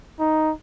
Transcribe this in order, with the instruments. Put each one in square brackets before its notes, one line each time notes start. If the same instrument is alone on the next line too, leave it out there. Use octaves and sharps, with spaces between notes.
[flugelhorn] D#4